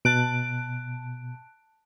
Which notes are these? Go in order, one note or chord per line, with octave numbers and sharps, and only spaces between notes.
B2 A5 F#6 D7